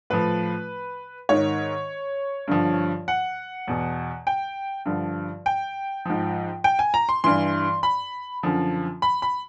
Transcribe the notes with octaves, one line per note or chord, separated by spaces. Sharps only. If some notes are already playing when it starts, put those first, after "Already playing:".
A2 F3 B4
G#2 D#3 C#5
G2 D3 F3
F#5
E2 B2
G5
G2 D3 F3
G5
G#2 F3
G5
G#5
A#5
C6
G2 E3 C6
B5
F#2 D3 F3
B5
B5